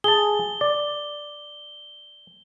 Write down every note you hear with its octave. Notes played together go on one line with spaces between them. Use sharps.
G#4 A5 G7
D5